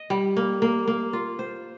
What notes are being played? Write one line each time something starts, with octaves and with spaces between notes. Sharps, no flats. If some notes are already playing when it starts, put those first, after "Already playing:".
Already playing: D#5
G3
A#3
A#3
A#3
F4
C5